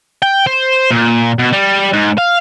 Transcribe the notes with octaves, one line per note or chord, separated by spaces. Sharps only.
G5
C5
A#2
B2
G3
G#2
F5